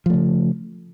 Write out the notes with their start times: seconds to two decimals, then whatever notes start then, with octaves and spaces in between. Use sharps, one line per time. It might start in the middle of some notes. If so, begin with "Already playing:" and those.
0.06 F3
0.10 A3
0.14 C#3